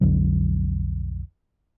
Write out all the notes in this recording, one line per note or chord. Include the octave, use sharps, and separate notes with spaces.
B1 F2 D3 F#3